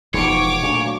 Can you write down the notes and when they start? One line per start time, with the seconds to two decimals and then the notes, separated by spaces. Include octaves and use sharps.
0.14 E1 G#2 F3 C#5 D6
0.62 D2 A#2 F#3